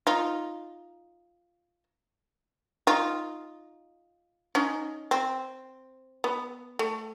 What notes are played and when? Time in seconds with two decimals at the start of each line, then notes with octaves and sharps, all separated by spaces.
0.07 D#4 F4
2.87 D#4 F4
4.55 C#4 D#4
5.11 C4
6.24 B3
6.79 A3